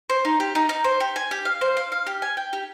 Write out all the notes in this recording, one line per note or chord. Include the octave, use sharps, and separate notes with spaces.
C5
D#4
G4
D#4
D#4
C5
G4
G#5
G4
F5
C5
F5
F5
G4
G#5
G5
G4